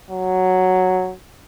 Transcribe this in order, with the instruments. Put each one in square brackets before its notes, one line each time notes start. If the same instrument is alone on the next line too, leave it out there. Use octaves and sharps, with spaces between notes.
[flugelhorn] F#3